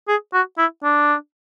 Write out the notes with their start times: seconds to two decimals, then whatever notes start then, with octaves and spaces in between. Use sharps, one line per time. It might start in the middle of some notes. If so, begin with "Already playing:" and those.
0.08 G#4
0.33 F#4
0.58 E4
0.84 D4